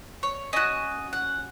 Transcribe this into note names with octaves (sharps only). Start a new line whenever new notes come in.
C#5
C#4 F#4 D#5
F#5